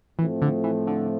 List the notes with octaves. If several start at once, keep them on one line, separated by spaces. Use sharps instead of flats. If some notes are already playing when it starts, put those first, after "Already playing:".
A2 E3 F3 A3 C4
D3
E3
D3